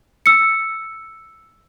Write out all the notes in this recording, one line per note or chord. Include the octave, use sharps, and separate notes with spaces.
E6 C#7